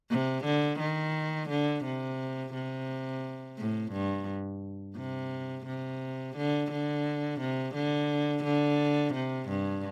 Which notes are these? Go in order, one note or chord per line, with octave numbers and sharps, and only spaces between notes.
C3
D3
D#3
D3
C3
C3
A2
G2
C3
C3
D3
D3
C3
D3
D3
C3
G2